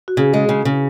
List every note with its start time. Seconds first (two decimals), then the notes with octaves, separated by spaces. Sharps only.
0.08 F#4
0.17 C#3 G#4
0.34 G#3
0.49 C#3
0.65 C#3